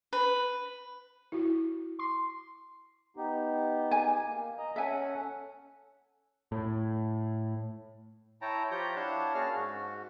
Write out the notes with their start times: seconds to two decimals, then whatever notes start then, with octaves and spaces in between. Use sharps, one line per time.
0.13 B4
1.32 E4 F#4
1.99 C6
3.17 B3 D#4 G4
3.91 G#5
4.27 A#3
4.58 D#5 A#5
4.76 C#4 A4 E5 F#5 G#5
6.52 A2
8.42 E4 C#5 G5 A5 A#5
8.71 F3 F4 G4 C#5 A#5 G6
8.96 D4 E4 C#5 F5 F#5 A5
9.35 A#3 C#4 F#4 G#4 A5 F6
9.55 G#2 F#4